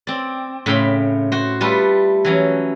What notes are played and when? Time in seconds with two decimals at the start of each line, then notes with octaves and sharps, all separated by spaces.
0.07 C4 D5
0.66 A2 C#3 G5 B5 C6
1.32 F#4 C5
1.61 G3 A3 F4 A4 B4
2.25 E3 F#3 C#4